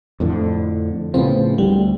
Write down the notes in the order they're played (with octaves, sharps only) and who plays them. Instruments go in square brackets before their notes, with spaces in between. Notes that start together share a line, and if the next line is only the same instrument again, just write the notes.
[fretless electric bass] F2 A2 D3
[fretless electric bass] A2 C#3 F3 [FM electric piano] B3 C4
[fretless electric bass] D2 [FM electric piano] G3